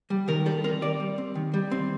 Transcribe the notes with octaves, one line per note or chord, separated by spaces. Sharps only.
G3
D#3 A#4
G3 A4
C4 A#4
G3 D5
G3
C4
D#3
G3
C4